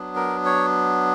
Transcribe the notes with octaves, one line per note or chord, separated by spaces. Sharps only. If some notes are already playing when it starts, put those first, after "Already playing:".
Already playing: F#3 B3 D4
A#4
C#5